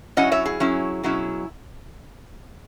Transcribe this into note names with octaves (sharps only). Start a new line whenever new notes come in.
F#3 C#4 E4 D#5 F#5
C#5 E5
G#4
F#3 C#4 E4
B2 F#3 C#4 E4